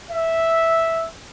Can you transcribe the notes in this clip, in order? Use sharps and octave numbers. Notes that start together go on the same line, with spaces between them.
E5